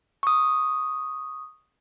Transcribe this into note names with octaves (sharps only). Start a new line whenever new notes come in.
C#6 D#6